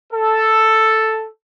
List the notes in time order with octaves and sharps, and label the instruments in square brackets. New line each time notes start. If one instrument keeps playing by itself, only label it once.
[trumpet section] A4